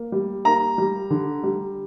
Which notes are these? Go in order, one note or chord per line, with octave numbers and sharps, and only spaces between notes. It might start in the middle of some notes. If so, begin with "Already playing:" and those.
Already playing: A#3
G3
A#3 A#5
G3
D3
G3